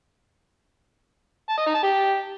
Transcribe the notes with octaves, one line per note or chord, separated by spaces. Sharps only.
A5
D#5
D#4
A5
G4